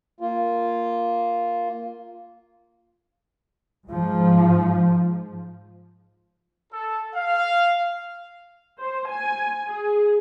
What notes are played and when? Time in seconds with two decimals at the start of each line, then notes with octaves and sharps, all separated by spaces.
0.20 A#3 F4
3.89 G#2 F3
6.72 A4
7.14 F5
8.80 C5
9.11 G#5
9.70 G#4